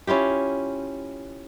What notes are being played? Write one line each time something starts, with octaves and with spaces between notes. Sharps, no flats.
C#4 E4 F4 G4